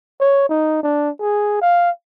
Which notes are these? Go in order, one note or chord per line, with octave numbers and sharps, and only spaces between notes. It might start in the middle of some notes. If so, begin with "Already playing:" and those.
C#5
D#4
D4
G#4
F5